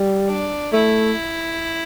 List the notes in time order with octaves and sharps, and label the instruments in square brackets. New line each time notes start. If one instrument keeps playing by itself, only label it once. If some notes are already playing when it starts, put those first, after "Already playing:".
Already playing: [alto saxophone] G3
[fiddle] D4
[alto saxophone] A3 [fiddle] E4